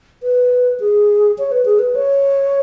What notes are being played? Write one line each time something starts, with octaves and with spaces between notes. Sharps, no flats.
B4
G#4
C#5
B4
G#4
B4
C#5